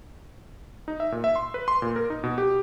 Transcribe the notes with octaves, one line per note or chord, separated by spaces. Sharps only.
D#4
E5
A#2
E5
C6
B4
C6
A#2
A#4
D#4
B2
G4